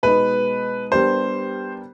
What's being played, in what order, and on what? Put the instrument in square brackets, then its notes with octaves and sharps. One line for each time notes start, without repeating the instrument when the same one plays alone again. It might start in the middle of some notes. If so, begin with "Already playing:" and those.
[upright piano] B2 G#3 B3 D#4 [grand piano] B4
[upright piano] G3 B3 D4 G4 A#4 [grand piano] C5